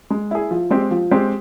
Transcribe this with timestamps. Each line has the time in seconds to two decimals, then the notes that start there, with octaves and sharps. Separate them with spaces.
0.10 G#3
0.31 E4 G#4
0.51 F3
0.70 G#3 C4 G4
0.91 F3
1.11 G#3 C4 G4